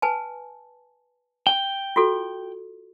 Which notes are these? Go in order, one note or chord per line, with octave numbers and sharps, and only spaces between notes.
B4 G#5 A5
G5
F4 F#4 A4